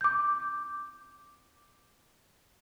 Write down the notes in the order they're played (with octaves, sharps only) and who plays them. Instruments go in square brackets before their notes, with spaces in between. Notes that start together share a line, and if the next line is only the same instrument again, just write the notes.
[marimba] D6 G6